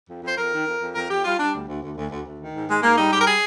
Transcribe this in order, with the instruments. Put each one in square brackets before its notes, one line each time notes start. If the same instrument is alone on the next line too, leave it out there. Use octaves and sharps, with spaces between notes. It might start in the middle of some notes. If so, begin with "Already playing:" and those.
[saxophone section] F2
F2 C5
F2 A#4
D#3
F2
F2
F2 A#4
F2 G4
G3 F4
G3 D4
D2
D2
D2
D2
D2
D2
D#3
G#2
G#2 G#3
G#2 A#3
G3 D#4
G#2 G4
A#4
G#4